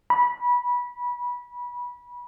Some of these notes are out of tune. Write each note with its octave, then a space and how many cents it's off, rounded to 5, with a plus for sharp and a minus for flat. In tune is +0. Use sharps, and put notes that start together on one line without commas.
B5 -20